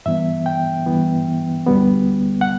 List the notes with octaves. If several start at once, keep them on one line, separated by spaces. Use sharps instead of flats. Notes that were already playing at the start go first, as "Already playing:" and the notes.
G2 E3 B3 E5
G5
G2 E3 B3
D2 D3 G3 B3
F#5